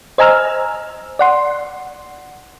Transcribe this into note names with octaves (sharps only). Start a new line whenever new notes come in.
C5 D#5 G#5 A#5 E6 F6
D5 F#5 C6